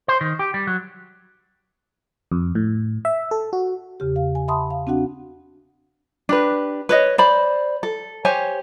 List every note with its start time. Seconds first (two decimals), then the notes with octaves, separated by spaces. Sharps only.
0.08 C5
0.21 D#3
0.39 G4
0.54 G3
0.67 F#3
2.32 F2
2.55 A2
3.05 E5
3.31 A4
3.53 F#4
4.00 E2 C#3 G4
4.16 F5
4.35 G#5
4.48 E5 F#5 A5 B5 C6 D#6
4.71 F5
4.87 C4 D4 F#4 F#5
6.29 D4 G4 B4
6.89 B4 C#5 D#5
7.18 C5 D5 B5
7.83 A4
8.25 G4 C5 C#5 G#5